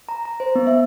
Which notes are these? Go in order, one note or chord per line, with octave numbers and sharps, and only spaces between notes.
A#5
A#5
C5
B3
E5